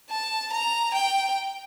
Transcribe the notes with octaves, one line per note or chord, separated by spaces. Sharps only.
A5
A#5
G5